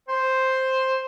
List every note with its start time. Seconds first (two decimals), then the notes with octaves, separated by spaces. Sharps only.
0.08 C5